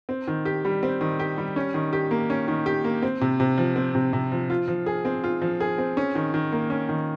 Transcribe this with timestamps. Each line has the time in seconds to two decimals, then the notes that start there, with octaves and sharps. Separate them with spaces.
0.09 C4
0.27 D#3
0.45 G4
0.65 G3
0.83 C4
1.01 D#3
1.19 G4
1.38 G3
1.56 C#4
1.74 D#3
1.93 G4
2.11 A#3
2.30 C#4
2.48 D#3
2.66 G4
2.84 A#3
3.02 C4
3.21 C3
3.40 C3
3.58 F3
3.76 C4
3.95 C3
4.13 C3
4.32 F3
4.50 F4
4.68 F3
4.86 G#4
5.05 C4
5.24 F4
5.42 F3
5.60 G#4
5.78 C4
5.97 C#4
6.15 D#3
6.34 D#3
6.52 A#3
6.70 C#4
6.89 D#3